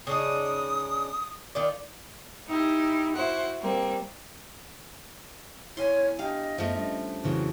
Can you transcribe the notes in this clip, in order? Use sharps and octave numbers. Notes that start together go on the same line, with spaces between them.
C#3 D4 D#4 D#6
D#3 F4 D5
D#4 E4 G4
E4 F#4 C5 F#5
G3 A#3 C4
E2 E4 C#5 G#5 C6
D4 G4 D#5 F5 G5
F#2 F3 A3 B3
G3 C#4 D4
F2 C#3 E3 F#4